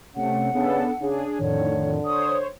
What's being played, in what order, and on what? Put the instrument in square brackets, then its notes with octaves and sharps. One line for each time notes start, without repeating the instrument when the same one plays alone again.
[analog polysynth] C3 A3 [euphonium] C#4 [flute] F#5
[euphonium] C#3 [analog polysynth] B3 D4 A4
[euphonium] C#3 [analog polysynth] D4 G#4
[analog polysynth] F2 A2 D#3 [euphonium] D3 [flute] C#5
[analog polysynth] C5 C#5 [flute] D#6